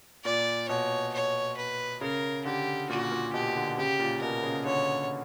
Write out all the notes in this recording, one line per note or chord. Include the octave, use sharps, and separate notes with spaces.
A#2 D5
B2 C#5
C#5
B4
C#3 A#4
D3 G4
A#2 F#4
A#2
B2 G4
D3
C#3 G4
A#2
B2 A#4
C#3
D3 C#5